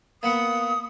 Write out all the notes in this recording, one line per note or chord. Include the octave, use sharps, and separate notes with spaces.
A#3 B3 F#5 D#6